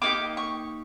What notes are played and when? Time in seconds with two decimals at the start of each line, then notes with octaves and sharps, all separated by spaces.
0.02 A#3 D#4 G4 D6
0.37 C#6